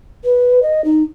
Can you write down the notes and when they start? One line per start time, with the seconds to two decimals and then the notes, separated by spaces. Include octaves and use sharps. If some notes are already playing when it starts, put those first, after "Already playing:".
0.24 B4
0.63 D#5
0.85 D#4